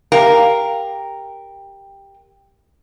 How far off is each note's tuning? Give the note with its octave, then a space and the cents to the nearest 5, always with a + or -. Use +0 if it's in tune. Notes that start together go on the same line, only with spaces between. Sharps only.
G4 +10 A#4 +0 F5 +0